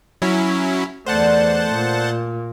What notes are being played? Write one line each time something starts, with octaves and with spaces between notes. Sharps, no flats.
F#3 C#4 E4
E2 D3 A3 D4 C5 F#5 A5
A#2